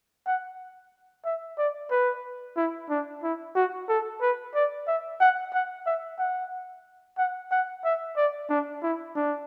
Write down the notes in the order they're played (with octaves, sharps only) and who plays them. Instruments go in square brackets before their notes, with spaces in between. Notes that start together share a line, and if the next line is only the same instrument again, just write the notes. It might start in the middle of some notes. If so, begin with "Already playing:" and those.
[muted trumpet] F#5
E5
D5
B4
E4
D4
E4
F#4
A4
B4
D5
E5
F#5
F#5
E5
F#5
F#5
F#5
E5
D5
D4
E4
D4